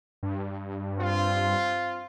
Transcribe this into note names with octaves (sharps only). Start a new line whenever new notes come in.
G2
C4 F4